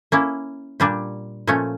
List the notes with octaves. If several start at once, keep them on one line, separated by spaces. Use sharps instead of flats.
A#3 C#4 E4
A#2 G3 D4 G4
A#2 F3 A3 C#4